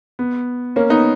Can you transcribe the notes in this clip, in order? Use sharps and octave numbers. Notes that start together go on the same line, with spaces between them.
B3
A#3 C#4
B3 D#4